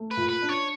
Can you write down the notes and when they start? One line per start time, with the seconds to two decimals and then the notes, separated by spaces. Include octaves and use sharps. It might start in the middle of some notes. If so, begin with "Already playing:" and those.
Already playing: A3
0.11 B4
0.17 A#2
0.29 B4
0.42 D4
0.49 C#5